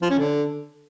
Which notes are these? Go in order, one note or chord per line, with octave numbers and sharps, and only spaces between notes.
F3
C#4
D3